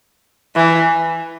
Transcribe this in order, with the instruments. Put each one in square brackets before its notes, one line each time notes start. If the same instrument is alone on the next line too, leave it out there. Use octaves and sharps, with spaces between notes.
[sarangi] E3